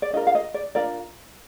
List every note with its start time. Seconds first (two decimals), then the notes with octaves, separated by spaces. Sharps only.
0.02 D5
0.13 D4 F4 A#4 D#5
0.27 F5
0.35 D#5
0.54 D5
0.75 D4 F4 A#4 D5